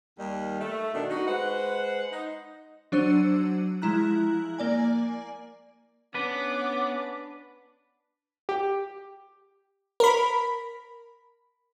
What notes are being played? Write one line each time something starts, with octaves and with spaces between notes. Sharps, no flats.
D#2 D#3 G3
A3
B2 D#3 D4
D#4 F#4
G#3 B4 C5 F#5
D#4
F#3 D4 C5 E6 C#7 D#7
F3 G#3 E4 A#5 F#6
A#3 D5 G#5
B3 C#4 D4 B4 D6
G4
A#4 B5